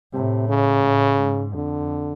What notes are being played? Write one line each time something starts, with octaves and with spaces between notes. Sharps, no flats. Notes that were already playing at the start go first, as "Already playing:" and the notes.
A2 C3
C#3
A2
G#2
F2 D3